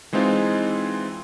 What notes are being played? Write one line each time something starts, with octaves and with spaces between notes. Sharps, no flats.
E3 G#3 C4 D#4 F4